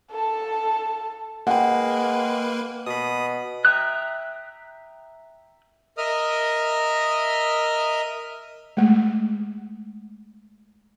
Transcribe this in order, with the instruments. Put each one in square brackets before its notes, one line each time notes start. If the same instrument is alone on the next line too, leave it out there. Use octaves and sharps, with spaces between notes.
[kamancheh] A4 A5
[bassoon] G#3 [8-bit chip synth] A#3 B4 [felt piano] F#5 G5
[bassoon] B2 [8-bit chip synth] B5 D#6
[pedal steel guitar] E5 G5 A#5 D#6 F#6
[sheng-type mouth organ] A#4 D#5 E5 D#6 F6
[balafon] G#3 A3